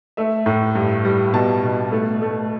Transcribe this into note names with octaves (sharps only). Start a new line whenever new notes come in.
A3 E5
A2
G2
G3
B2 A5
B2
A3
A3